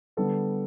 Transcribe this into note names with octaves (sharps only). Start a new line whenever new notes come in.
D3 G3 B3 A4